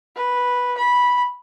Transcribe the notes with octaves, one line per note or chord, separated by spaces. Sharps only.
B4
B5